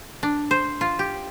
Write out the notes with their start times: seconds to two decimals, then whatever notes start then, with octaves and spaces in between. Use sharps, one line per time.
0.23 D4
0.51 C5
0.81 F4
0.99 G4